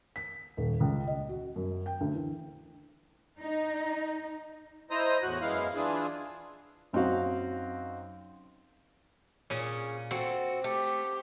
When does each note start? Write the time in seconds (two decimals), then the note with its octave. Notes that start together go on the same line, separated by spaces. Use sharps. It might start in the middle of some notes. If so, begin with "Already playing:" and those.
0.16 B6
0.57 D#1
0.80 C#2
1.07 D#5
1.29 F#4
1.56 F#2
1.86 G5
2.01 D2
2.15 E3
3.39 D#4
4.91 E4 C5 D#5 A#5 D#6
5.23 E2 A2 F#4 F#6
5.41 F#2 G#3 B3 E4 F5
5.75 E3 D4 E4 F4 G#4
6.93 F#2 C4 D#4 F#4 F5
9.50 A#2 C#4 G#4
10.11 C4 F#4 A4
10.64 A3 G4